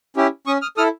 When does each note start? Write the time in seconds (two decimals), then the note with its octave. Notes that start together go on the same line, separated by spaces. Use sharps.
0.16 C#4 E4 G4
0.46 C#4 C#6 D#6
0.62 D#6 F6
0.77 E4 A4 D#6 F6